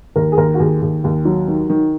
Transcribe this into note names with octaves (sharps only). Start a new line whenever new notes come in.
D#2 A#4
G#4
D#2 A#4
F#4
D#2 G#4
D#2
D#2
F#3
D#3
D#3